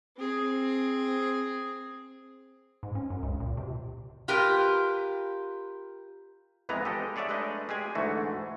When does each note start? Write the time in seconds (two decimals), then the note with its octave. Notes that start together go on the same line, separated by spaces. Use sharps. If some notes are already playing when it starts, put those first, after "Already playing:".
0.18 C4 G#4
2.83 G#2
2.95 C#4
3.10 F#2
3.23 C#2
3.40 A#2
3.57 C3
4.28 F4 G4 A#4 B4
6.69 F2 E3 G#3 B3 B4 A#5
6.85 G#3 G4 A4 D#5
7.16 G#4 C#5 D5 E5 F#5
7.29 G#3 A3 D4 B4 D#5
7.69 G#3 G4 G#4 G#5
7.95 D2 G#2 E3 A3 F#4